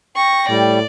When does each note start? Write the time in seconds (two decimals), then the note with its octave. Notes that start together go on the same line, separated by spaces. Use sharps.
0.16 G5 C#6 A#6
0.49 A2 G3 D5